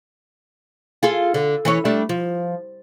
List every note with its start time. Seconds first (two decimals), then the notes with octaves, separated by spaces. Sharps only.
1.03 F4 G#4 A4
1.34 D3
1.65 E3 C#4 C#5
1.85 G3 A3 D4
2.09 F3